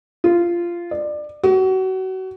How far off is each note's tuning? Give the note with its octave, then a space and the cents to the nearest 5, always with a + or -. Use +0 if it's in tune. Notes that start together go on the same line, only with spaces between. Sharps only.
F4 -15
D5 +25
F#4 +30